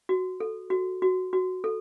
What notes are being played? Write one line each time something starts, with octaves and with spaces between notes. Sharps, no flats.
F#4
A4
F#4
F#4
F#4
A4